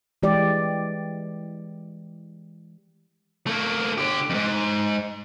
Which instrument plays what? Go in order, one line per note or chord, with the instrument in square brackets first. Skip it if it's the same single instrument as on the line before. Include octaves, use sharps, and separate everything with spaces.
[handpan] E3 G#3 G4 D5
[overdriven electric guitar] A3 A#3
D3 G4
F2 G#2